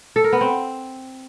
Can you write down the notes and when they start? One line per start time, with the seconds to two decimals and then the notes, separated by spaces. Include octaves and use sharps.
0.16 A4
0.24 A#4
0.33 B3
0.41 C4